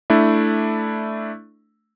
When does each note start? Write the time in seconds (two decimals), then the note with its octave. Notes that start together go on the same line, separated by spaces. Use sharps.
0.10 A3 D4 E4